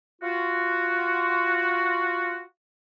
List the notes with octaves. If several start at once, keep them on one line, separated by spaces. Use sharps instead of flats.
F4 F#4